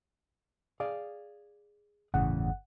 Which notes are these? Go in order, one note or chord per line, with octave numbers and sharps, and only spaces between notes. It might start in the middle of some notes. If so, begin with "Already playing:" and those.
G#4 D5 F5
G1 E2 A2 C#3 F#5